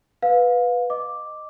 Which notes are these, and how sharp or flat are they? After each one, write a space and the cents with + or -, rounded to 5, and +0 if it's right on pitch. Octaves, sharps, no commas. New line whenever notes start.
B4 +0 F5 +25
D#5 -10 D6 +0